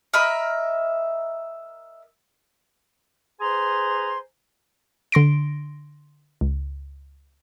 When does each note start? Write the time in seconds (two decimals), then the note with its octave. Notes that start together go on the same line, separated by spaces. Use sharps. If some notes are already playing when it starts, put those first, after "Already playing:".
0.13 A#4 D#5 E5 B5
3.40 G#4 B4 C5 G#5 A#5 C6
5.12 D3 C6 A#6 D7
6.41 C#2